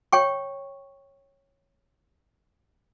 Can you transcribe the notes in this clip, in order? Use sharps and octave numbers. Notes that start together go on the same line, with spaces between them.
C#5 G5 C#6